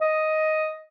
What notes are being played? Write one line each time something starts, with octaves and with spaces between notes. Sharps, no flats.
D#5